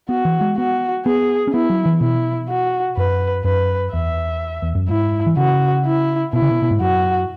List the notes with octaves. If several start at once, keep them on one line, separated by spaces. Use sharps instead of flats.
B3 F#4
E3
G#3
B3 F#4
B3 G#4
C#4
B3 E4
F#3
E3
B2 E4
F#4
F#2 B4
F#2 B4
E2 E5
E2
F#2
G#2 E4
E3
C#3 F#4
E4
B2 E4
C#3
B2
B2
G#2
F#2 F#4